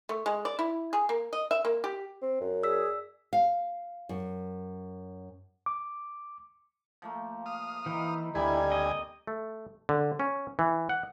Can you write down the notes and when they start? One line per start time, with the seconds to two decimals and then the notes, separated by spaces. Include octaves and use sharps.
0.09 A3
0.26 G#3
0.45 D5
0.59 E4
0.93 G#4
1.09 A#3
1.33 D#5
1.51 E5
1.65 A#3
1.84 G4
2.22 C4
2.41 F#2
2.63 G#4 D5 E6 B6
3.33 F5
4.09 F#2
5.66 D6
7.02 F3 A3 A#3
7.46 F5 D#6
7.86 E3 D#4 G5
8.35 D2 D#3 G3 E4 G#5
8.72 C4 D#5 D6
9.27 A3
9.89 D3
10.20 C#4
10.59 E3
10.89 F#5